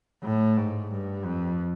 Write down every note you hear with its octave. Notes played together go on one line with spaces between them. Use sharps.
A2
G#2
G2
F2